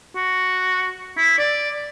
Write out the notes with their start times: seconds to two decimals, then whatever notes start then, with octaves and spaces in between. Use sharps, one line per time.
0.15 F#4
1.17 E4
1.38 D5